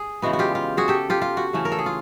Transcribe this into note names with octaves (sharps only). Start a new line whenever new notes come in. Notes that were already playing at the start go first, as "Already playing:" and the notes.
Already playing: G#4
C#3 E3 G#3 B3 F#4
F#4
F4 G4
F4
F#4 G#4
G4 A4
F4 G4
F4
F#4
C#3 E3 A3 C#4
A#4
A4
G#4
F4